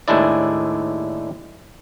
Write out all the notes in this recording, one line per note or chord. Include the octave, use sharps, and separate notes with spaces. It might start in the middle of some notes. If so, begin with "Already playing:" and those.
D#2 A2 G#3 D4 E4 D5